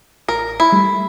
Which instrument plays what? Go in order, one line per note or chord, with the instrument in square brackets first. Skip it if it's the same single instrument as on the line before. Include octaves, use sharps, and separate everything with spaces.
[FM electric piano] A1 [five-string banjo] A#4
[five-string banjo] E4
[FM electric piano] G3 A3